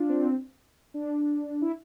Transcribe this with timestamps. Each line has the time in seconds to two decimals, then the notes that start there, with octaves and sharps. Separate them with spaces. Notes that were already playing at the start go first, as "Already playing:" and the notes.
Already playing: D4 F4
0.09 C4
0.94 D4
1.62 E4